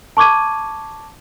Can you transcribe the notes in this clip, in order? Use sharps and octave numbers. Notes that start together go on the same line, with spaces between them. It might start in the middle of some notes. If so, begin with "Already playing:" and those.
A5 C#6 D6 G#6 D#7